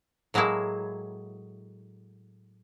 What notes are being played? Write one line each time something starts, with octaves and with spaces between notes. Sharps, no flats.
A2 F#3 G#3 A#3 E4